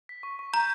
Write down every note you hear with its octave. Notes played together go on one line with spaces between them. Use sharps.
B6
C#6
C#6
A#5 G6